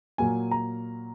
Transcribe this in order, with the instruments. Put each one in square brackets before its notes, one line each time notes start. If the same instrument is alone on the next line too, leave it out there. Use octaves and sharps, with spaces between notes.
[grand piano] A#2 F#3 A#3 G#5
A#5